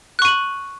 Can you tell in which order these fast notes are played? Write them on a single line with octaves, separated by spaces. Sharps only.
F#6 C#6 D#7 F#7